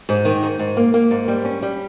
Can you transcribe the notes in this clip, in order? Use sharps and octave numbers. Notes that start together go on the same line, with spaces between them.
G#2
D#3
G#2
G#2
A#3
A#3
G#2
G3
C#4
G3